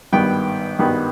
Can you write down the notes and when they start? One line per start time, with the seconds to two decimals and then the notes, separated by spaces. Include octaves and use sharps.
0.12 G#1 G2 D#3 G3 B3 G5
0.79 G#1 G2 D#3 G3 B3